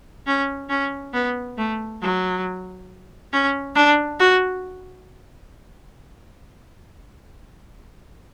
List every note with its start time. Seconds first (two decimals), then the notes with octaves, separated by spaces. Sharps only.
0.27 C#4
0.69 C#4
1.13 B3
1.58 A3
2.01 F#3
3.33 C#4
3.75 D4
4.19 F#4